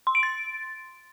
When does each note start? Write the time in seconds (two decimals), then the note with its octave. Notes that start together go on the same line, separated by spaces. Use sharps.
0.07 C6
0.15 D7
0.23 A6